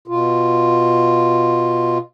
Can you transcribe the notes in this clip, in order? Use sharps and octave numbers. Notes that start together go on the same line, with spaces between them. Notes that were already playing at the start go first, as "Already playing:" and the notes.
B2 F4